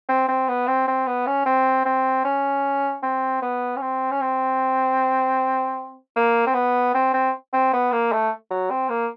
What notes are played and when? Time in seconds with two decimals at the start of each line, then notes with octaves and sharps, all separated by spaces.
0.09 C4
0.28 C4
0.48 B3
0.67 C4
0.87 C4
1.07 B3
1.27 C#4
1.46 C4
1.85 C4
2.24 C#4
3.02 C4
3.42 B3
3.76 C#4
3.81 C4
4.11 C#4
4.21 C4
6.16 A#3
6.47 C4
6.54 B3
6.94 C4
7.13 C4
7.53 C4
7.73 B3
7.92 A#3
8.12 A3
8.50 F#3
8.70 C4
8.89 A#3